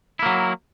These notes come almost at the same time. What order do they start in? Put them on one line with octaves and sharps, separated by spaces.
E4 A#3 F#3